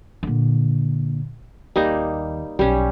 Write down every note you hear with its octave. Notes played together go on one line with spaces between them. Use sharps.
A#2 D3
D#2 G3 A#3 D#4
B1 G3 C#4